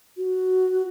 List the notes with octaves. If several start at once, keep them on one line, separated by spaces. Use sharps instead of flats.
F#4